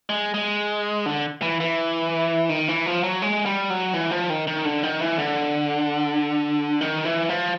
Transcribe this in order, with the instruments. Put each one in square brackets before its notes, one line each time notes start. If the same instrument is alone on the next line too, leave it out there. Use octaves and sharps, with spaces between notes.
[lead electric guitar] G#3
G#3
D3
E3
E3
D#3
E3
F3
F#3
G#3
G3
F#3
E3
F3
D#3
D#3
D3
D#3
E3
D3
D#3
E3
F3